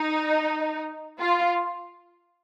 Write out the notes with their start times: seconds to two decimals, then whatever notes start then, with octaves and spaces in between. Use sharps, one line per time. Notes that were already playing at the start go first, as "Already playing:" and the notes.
Already playing: D#4
1.19 F4